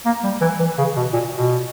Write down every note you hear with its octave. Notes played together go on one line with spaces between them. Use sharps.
A#3
G3
E3
E3
C#3
B2
A#2
B2